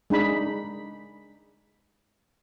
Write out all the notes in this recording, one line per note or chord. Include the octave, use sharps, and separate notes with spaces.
G#3 D4 D#4 B5